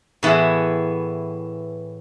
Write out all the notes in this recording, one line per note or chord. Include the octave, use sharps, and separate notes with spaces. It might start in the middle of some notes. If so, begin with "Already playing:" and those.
A2 E3 B3 E4 G#4